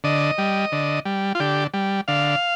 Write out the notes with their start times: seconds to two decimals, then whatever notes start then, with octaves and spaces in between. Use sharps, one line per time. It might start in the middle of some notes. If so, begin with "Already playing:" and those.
0.04 D3 D#5
0.38 G3
0.72 D3
1.05 G3
1.35 F4
1.40 D3 G4
1.74 G3
2.08 D3 F5